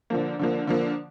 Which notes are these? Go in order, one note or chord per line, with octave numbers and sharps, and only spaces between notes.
D3 F3 A#3
D3 F3 A#3
D3 F3 A#3